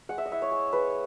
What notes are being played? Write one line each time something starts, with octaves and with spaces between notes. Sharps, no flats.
G#3 F#5
E5
D#5
E4 E5
C#5
G#3
G#3 B4